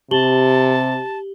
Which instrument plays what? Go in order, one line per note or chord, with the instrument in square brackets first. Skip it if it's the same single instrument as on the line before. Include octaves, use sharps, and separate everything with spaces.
[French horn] C3 [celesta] G4 F#7 G7 [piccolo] A5